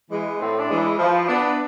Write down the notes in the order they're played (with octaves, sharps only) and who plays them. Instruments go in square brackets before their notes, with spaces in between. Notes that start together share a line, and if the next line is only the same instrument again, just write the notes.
[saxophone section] E3 G#3
[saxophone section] A2 [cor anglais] C4
[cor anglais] D4
[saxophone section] E3 G#3
[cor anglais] E4
[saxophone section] F3 [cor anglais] E4
[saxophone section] B3 D4